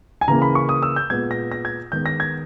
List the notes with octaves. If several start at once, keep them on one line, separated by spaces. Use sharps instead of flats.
G#5
C#3 E3 A#3 A#5
B5
C#6
D#6
E6
G6
A#2 G#3 B3 G#6
A#6
A#6
G#6
D#3 G#3 B3 G6
A#6
G#6